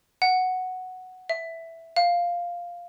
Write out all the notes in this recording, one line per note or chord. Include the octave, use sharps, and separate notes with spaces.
F#5
E5
F5